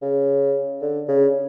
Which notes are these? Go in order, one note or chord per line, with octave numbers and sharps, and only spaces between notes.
C#3
D3
C#3